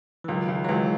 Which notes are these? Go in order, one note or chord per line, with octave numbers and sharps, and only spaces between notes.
E3
C#2 D#3 F#3
C#2
F#3
C#2 E3 G#3